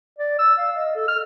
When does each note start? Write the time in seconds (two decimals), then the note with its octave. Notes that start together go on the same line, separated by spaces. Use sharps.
0.19 D5
0.39 E6
0.58 F5
0.76 D#5
0.95 A4
1.08 F6